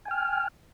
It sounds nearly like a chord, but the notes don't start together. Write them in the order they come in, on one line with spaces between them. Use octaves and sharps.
G#5 G5 F6